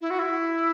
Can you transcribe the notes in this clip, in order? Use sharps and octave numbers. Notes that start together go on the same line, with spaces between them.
E4
F#4
E4